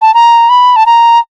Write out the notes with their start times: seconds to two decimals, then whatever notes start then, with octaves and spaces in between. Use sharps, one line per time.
0.02 A5
0.14 A#5
0.49 B5
0.76 A5
0.86 A#5